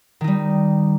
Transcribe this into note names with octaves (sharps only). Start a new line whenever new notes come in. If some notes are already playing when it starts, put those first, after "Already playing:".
D#3 G3 D#4